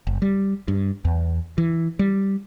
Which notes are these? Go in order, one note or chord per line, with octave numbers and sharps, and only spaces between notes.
F#1
G3
G2
E2
E3
G3